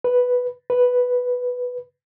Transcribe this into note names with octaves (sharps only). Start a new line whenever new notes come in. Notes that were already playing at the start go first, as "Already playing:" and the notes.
B4
B4